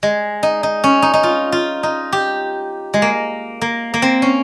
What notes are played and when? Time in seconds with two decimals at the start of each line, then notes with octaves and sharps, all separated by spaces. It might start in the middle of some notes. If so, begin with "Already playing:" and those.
0.03 G#3
0.43 D#4
0.63 D#4
0.84 C#4
1.02 D#4
1.14 D#4
1.23 F4
1.52 F4
1.83 D#4
2.13 G4
2.94 G#3
3.02 A#3
3.61 A#3
3.94 A#3
4.02 C4
4.22 C#4